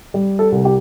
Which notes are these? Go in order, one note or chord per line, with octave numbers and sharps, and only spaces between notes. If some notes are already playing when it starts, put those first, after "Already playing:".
G3
A4
C2
G4